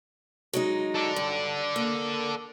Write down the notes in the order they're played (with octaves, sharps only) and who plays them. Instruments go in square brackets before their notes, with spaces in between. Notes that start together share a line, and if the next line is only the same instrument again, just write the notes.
[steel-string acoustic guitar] F#3 G#3 D#4
[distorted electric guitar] A4 D5
[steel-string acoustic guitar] G2
A#3